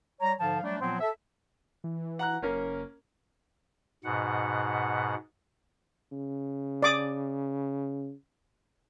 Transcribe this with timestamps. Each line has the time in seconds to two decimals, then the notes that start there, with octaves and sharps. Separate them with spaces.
0.21 G3 C#5 A#5
0.39 G#2 D3 F3 F5 A5
0.63 F#3 G3 A3 D4
0.80 A#2 F3 F#3 B3 C4
1.01 A4 E5
1.84 E3
2.19 F#5 A#5 F#6
2.43 F#1 A#3 C#4 A#4
4.04 G#2 B2 F#5
6.12 C#3
6.82 D5 D6 D#6